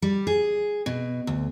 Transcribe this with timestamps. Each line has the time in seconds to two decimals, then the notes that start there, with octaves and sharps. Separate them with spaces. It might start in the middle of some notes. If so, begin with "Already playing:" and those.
0.02 G3
0.27 G#4
0.86 B2
1.27 D2